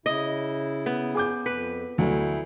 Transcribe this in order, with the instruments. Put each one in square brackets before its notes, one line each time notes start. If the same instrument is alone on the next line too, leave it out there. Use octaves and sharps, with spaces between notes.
[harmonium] C#3 E4 [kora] D#5
[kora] B3
[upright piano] G#4 D6 G6
[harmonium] F2 [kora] B4
[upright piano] D2 F#3 A3 [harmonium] E4